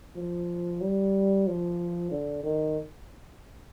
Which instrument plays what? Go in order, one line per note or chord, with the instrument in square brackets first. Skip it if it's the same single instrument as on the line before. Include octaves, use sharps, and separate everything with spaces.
[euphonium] F3
G3
F3
D3
D#3